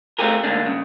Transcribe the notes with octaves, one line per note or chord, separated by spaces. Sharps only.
A3 C4 F4 G4 G#4 A#4
D2 G#2 A#3 D4
G2 C#3